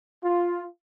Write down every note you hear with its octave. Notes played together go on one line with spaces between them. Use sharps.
F4